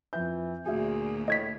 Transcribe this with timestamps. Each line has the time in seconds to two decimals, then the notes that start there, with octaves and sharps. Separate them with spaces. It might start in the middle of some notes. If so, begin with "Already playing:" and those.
0.13 F2 E3 F3 G6
0.66 D2 A#2 F#4 G#4 E5
1.28 A2 D#5 G#6 B6